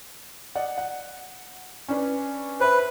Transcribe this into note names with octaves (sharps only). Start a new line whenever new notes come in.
D5 D#5 F#5
F#5
C#4 D4 B4
B4 C5 E5